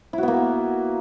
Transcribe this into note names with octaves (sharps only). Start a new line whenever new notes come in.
A#3 B3 E4 F#4